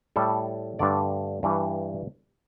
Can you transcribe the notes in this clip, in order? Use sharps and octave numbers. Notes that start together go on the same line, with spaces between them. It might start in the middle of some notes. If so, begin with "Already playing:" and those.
A2 G3 A4
G2 D3 A3 D5
G2 E3 G3